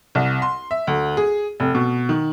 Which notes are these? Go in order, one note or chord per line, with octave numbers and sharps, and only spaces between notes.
C2
C6
E5
D2
G#4
F1
B2
D#3